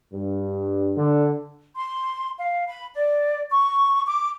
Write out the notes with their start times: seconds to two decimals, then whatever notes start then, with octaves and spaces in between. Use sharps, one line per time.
0.13 G2
0.97 D3
1.76 C6
2.39 F5
2.68 B5
2.94 D5
3.51 C#6
4.06 D6